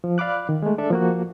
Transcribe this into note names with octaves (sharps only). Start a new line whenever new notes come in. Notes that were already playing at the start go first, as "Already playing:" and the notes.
F3
D5 F5 B5 D6 F#6
D#3
G#3 A3
D4 A4 D5 E5
F3 A#3 F#4